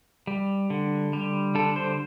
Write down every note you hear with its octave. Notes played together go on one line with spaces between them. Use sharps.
G3
D3
G3
D3 A4
C5